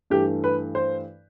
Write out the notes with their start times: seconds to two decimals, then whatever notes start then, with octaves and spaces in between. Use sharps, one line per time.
0.10 G2 E3 A3 G4
0.44 B4
0.75 C5